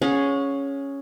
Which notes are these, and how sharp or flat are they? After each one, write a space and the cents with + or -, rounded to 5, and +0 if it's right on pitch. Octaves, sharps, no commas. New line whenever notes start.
C#4 +0 G#4 +0 F#5 -45